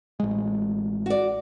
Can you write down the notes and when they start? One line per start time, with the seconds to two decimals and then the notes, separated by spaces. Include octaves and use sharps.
0.20 A1 G#3
1.06 F#4 D5